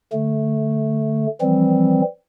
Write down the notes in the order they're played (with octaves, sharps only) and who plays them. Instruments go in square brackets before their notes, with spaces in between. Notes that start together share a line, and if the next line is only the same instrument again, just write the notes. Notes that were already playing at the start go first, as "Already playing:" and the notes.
[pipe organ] D3 A3
E3 F3 G3 C4